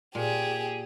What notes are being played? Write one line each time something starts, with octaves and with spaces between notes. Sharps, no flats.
A#2 G4 G#4